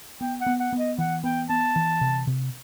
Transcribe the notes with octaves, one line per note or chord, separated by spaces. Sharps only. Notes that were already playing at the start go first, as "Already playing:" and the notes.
B3 G5
F#5
B3
F#5
B3
D#5
E3 F#5
B3 G5
B3 A5
E3
C3
C3